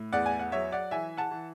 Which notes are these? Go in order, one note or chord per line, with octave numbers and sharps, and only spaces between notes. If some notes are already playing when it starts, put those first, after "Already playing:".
Already playing: A2
E2 D5 F#5
G#5
F#5
F#3 C#5 E5
D5 F#5
E3 E5 G#5
F#5 A5
E3